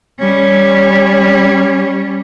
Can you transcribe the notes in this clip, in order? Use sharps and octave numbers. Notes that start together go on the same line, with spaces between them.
G3 C#4